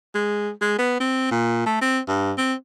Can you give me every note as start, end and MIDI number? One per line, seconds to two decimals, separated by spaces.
0.15 0.51 56
0.61 0.77 56
0.79 0.97 59
1.00 1.31 60
1.31 1.65 46
1.66 1.77 57
1.81 1.99 60
2.08 2.32 43
2.38 2.54 60